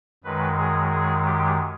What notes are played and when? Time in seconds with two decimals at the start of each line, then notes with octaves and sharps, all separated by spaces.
0.24 F#2 D#3 G#3 B4
0.57 G#4
0.91 G#4
1.25 G4